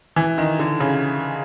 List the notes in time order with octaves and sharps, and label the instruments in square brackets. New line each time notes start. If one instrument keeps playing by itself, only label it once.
[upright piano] E3
D#3
D3
C#3